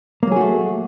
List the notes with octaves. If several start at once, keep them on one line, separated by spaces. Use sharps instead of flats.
F#3 A3 A#3 F#4 G#4